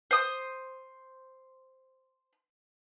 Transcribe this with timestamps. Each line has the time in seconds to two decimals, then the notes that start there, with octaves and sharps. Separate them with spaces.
0.11 C5 D#6